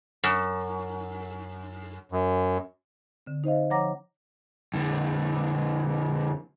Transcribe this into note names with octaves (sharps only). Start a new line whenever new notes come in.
F#2
F#2
D3 C4
D#4 C5 D#5 F5
F3 C#5 F#5 A#5 D6 A#6
F2 D3